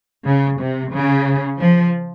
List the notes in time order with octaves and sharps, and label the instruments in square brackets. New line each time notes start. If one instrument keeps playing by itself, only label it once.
[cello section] C#3
C3
C#3
F3